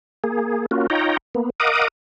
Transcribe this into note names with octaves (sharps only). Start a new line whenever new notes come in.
A#3 G#4
A#3 C#4 F4 F#4
D#4 F4 C#5 G5 A#5
A#3 B3
A#4 D#5 F5 F#5 D6 D#6